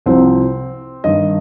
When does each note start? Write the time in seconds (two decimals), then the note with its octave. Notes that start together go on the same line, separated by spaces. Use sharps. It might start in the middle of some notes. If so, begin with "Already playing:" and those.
0.06 C2 C3 F3 C4
1.04 G2 D#3 D#5